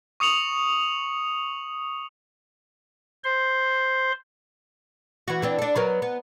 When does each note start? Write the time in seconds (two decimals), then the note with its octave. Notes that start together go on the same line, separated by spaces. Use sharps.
0.20 C#6 D#6 C#7 F7 F#7
3.24 C5 C6
5.28 E3 F#4
5.42 E3 C4 D4
5.59 D4 A4
5.76 F#3 B3 A#4
6.02 B3